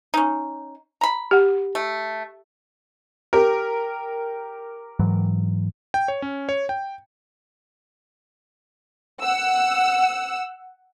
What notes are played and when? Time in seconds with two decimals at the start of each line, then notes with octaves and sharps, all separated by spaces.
0.14 C#4 D#4
1.01 A#5 B5
1.31 G4 F#5
1.75 A3
3.33 G4 A#4
4.99 G#2 E3 F#3
5.94 G5
6.08 C#5
6.22 C#4
6.49 C#5
6.69 G5
9.21 F#5 E6